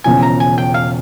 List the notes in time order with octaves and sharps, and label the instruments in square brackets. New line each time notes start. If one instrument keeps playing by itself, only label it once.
[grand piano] E1 E2 C#3 F3 [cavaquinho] G#5
[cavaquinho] A#5
G#5
G5
F5